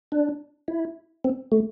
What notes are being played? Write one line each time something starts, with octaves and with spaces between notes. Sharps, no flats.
D4
E4
C4
A3